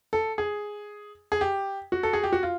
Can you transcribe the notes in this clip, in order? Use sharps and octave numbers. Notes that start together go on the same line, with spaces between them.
A4
G#4
G#4
G4
F#4
A4
G#4
G4
F#4
F4